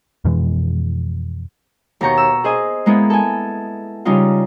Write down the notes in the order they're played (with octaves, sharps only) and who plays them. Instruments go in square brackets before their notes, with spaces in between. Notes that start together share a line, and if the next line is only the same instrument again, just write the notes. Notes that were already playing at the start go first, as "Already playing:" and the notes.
[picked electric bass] F2 B2 E3 G#3
[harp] D#2 B2 A#5 C#6 G6
E6
G#4 C5 D#5 G#5
G#3 A#3 B3 E4
A4 G#5
C#3 G3 C#4 D#4 F4